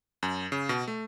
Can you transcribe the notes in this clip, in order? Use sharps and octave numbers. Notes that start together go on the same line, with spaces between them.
F#2
C#3
B2
A3